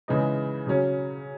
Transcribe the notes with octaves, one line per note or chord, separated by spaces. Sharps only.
C#3 E3 G#3 D#4
C#3 F#3 C#4